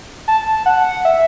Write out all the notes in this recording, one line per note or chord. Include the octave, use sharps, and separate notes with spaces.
A5
F#5
E5